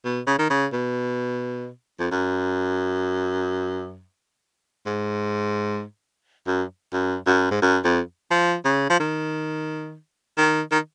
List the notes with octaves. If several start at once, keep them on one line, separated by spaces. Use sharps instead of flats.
B2
C#3
D#3
C#3
B2
F2
F#2
G#2
F#2
F#2
F#2
G#2
F#2
F2
F3
C#3
F3
D#3
D#3
D#3